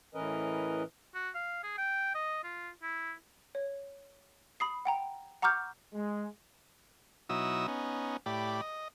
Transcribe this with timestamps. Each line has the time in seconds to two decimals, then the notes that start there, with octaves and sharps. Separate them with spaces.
0.15 A2 E3 C#4 A#4 B4 D#5
1.15 F#4
1.35 F5
1.63 G#4
1.78 G5
2.15 D#5
2.44 F4
2.83 E4
3.55 C#5
4.60 B5 D#6 C7
4.85 F#5 G5 A#5
5.42 F#5 A#5 C#6 D6 F6 G6
5.94 G#3
7.29 B2 F#3 D#4 E4 D#6 E6
7.68 B3 C#4 D#4
8.26 A2 G4 D5 B5
8.61 D#5